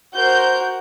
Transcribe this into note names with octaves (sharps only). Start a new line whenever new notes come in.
F#4 A#4 C5 G6